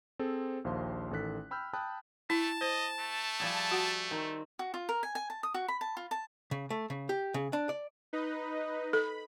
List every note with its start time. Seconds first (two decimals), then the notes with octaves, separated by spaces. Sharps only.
0.19 C4 G#4 A4 C5
0.65 A#1 D#2 C5 F5 C6
1.11 A1 D#3 A4 F#6 B6
1.51 G5 B5 E6 F6 G6
1.73 G5 A5 B5 D#6 F#6
2.30 A3 E4 A5
2.61 C5 D#5
3.00 A3
3.40 F3 G3 G#4
3.71 F#4 F#5
4.11 D#3 C4
4.59 F#4
4.74 F4
4.89 A#4
5.03 G#5
5.15 G#5
5.30 A5
5.43 D#6
5.54 F#4
5.68 B5
5.81 A5
5.97 F4
6.11 A5
6.51 C#3
6.70 A3
6.90 C#3
7.09 G4
7.34 C#3
7.53 D4
7.69 D5
8.13 D#4 B4 D#5
8.93 A4 B5